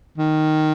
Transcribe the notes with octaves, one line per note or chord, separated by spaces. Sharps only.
D#3